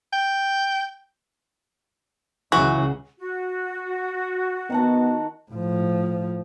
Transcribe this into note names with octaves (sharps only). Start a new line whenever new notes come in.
G5
C#2 C#3 E3 F#3 F#4
F#4
D#3 B3 F#5 A5
A2 F3